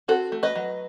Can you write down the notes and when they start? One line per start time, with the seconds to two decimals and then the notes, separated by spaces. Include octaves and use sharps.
0.08 C4 F#4 A4
0.32 A3
0.43 B4 D#5
0.56 F#3